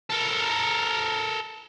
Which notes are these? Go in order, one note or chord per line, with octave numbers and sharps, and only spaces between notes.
A4 A#4